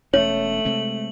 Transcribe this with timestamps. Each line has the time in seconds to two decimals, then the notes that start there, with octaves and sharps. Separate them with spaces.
0.14 E1 A3 C#4 C#5 F#7
0.65 C3 G#3 C4